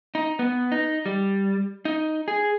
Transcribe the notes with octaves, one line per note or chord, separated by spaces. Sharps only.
D#4
B3
D#4
G3
D#4
G#4